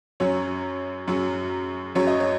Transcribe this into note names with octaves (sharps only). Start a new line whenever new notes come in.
F#2 F#3 C#4 C#5
F#2 F#3 C#4
F#2 F#3 C#4 C#5
D#5
C#5